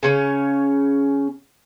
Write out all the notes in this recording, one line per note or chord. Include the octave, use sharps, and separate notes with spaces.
C#3 C#4 C#5